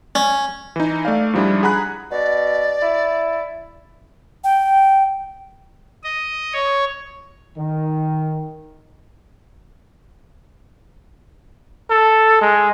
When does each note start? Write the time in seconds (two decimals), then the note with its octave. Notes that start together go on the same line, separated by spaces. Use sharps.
0.15 C#4
0.76 E3 D#4
1.05 A3 D5 F5
1.33 G#2 F3 G3 D4 E4
1.63 G#4 F#5 A#5 B5 F#6
2.11 B2 D5
2.82 E4
4.44 G5
6.04 D#5
6.53 C#5
7.57 D#3
11.90 A4
12.41 G#3